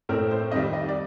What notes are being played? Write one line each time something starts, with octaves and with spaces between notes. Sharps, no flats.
A2 A3 C4 A#4
C5
F2 D#3 G3 D#5
D#5
D5